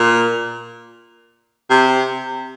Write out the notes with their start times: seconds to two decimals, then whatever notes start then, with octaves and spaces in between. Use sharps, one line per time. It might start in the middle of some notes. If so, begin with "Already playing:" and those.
Already playing: A#2
1.70 C3